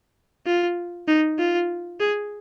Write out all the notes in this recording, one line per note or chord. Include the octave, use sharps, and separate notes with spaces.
F4
D#4
F4
G#4